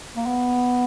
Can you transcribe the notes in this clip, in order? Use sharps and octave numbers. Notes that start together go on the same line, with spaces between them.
A#3
B3